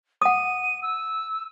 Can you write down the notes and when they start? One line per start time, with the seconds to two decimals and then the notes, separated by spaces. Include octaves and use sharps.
0.22 F#5 D#6 D#7
0.82 E6